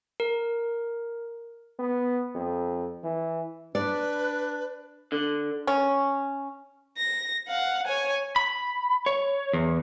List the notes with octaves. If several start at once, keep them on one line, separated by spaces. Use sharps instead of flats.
A#4
B3
F2
E3
D4 B4 D5
D3
C#4
A#6
F5 F#5
C#5 G#5
B5
C#5
E2